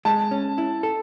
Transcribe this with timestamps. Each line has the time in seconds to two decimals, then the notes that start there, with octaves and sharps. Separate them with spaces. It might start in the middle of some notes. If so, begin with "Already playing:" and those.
0.05 G#3 A5
0.31 C#4
0.58 E4
0.83 A4